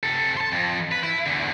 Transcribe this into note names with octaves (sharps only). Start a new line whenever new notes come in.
C3 A4
A5 C6
F2
B4
E4
E2 D3